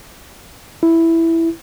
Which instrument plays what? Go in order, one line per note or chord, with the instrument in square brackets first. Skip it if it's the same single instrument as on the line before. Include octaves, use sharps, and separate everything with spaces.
[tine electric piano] E4